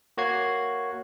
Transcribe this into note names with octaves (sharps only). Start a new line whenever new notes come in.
A#3 F#4 C#5 G#6 C7